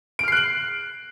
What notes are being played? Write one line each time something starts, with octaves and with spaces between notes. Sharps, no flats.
F6 F#6 C7 D7 F#7